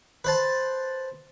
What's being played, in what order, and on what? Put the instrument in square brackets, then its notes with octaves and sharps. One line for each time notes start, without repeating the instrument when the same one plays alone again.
[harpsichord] B4 C5 A5